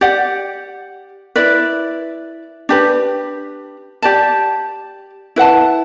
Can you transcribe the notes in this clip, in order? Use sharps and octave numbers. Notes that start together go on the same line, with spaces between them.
G4 D5 F#5
E4 B4 D5
D4 G4 B4
G4 D5 A5
E4 B4 F#5 A5